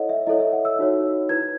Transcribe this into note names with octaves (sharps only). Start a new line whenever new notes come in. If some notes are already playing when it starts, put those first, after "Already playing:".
Already playing: E4 A4 C#5 D#5 F#5
E5
E4 A4 C#5 D#5
E5
F#5
E6
D#4 F#4 C#5
E4 B4 G#6